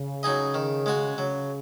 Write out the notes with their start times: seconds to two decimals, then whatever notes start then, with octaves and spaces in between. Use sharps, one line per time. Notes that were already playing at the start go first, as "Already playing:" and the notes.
Already playing: C#3
0.23 F#3 D#4 G#4 D#5
0.54 D#3
0.86 G#3 F#4 C#5
1.17 C#3 F#3